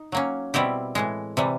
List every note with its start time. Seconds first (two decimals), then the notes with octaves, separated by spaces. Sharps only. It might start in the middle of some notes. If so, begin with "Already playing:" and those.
Already playing: D#4
0.12 F#3 A#3 C#4
0.54 B2 G3 C4 E4 G4
0.95 A2 E3 G#3
1.37 C3 E3 G3